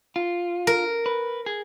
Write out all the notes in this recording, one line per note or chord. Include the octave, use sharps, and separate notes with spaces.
F4
A#4
B4
G#4